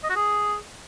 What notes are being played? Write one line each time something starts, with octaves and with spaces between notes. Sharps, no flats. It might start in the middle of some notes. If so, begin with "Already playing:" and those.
D#5
F#4
G#4